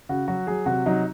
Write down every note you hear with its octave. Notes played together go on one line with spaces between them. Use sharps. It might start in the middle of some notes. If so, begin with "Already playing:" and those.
C#3 F#4
F#3 F#4
F#3 G#4
C3 F#4
F#3 D#4